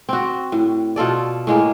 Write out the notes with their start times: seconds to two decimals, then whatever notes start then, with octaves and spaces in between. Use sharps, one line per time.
0.09 C4 F#4
0.52 A2
0.96 B2 F4 A4 D5
1.47 A2 G#3 A#3